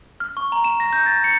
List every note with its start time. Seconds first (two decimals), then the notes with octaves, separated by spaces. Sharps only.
0.20 F6
0.37 C#6
0.52 A#5
0.64 E7
0.80 A#6
0.93 G6
1.06 A6
1.24 C#7